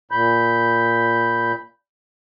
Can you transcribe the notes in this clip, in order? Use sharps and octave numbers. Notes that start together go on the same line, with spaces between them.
A#2 B5 G6